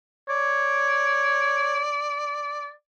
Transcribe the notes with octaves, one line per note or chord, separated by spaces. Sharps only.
C#5 D5